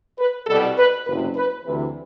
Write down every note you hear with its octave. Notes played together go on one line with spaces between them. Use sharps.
B4
C2 B2 G3 A4
B4
F#1 E2 C3 B4
B4
D2 C3 E3 B4